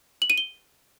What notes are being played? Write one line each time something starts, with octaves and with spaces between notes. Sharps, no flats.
F#7
D#7
G7